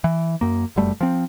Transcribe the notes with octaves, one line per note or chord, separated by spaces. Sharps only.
E3
F#2 A#3
F1 F#2 G3 A3
F3 C4